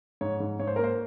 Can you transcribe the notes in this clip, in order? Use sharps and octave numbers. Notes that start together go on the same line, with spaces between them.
G#2 C#5
G#2
G#2 C#5
C5
A#3 A#4
C5